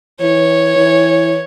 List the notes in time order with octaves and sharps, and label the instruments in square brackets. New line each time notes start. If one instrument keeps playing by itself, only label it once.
[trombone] E3 [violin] C#5
[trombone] E3